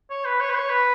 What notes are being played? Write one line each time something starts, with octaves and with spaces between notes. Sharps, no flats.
C#5
B4
C#5
B4
C#5
B4